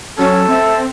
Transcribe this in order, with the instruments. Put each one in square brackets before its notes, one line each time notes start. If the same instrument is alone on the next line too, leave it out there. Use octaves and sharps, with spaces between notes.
[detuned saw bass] F#3 [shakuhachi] C#4 [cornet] A4
[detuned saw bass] C4 [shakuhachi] E5